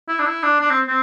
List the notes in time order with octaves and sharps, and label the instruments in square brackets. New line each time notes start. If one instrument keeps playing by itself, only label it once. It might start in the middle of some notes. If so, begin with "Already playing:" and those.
[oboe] E4
D4
E4
D4
D4
C4
C4